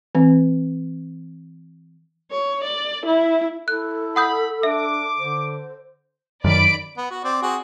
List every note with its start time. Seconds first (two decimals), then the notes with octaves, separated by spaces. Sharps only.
0.15 E3 C4
2.31 C#5
2.64 D5
3.06 E4
3.68 E4 A4 F#6
4.16 F#5 B5 D#6 G6
4.63 D4 E5 D6
5.19 D3 C5
6.44 F#2 D#3 D5 B5 D7
6.97 B3
7.10 F#4
7.24 C4 D5
7.42 C4 F#4 G#4